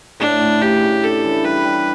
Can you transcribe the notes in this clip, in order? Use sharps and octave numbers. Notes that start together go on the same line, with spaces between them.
A2 D4
A2
C#3 G4
C#3
D4 A4
E3
G3 B4
G3